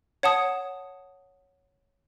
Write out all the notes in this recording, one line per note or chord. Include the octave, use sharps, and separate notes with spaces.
C#5 F#5 A5 D#6